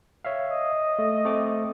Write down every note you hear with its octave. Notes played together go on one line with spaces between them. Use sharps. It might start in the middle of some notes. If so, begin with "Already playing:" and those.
C#5 E5 F5
D#5
A3
A3 C4 D6